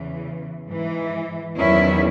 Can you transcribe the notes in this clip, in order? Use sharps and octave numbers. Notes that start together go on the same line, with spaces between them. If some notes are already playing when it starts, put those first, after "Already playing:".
Already playing: E2 C#3 E3
G#2 E3
E2 D#3 F#3 C#4 E4